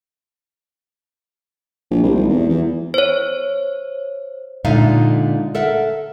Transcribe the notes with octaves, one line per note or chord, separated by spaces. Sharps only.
A#1
C2
G#1
E2
E2
C5 C#5
A#2 D3 G#3 D#4 E5 F5
A4 A#4 E5 F#5